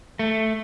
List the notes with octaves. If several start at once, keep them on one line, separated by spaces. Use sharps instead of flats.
A3